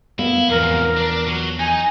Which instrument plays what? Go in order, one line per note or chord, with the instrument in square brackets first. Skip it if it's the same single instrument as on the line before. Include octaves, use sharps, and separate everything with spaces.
[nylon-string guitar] B3 A#4 F5 [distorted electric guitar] E4
[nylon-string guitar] E2 F3 [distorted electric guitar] G#2 C3 [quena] A#4
[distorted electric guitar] D4 D5
F#3
[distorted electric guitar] D#4 [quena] G#5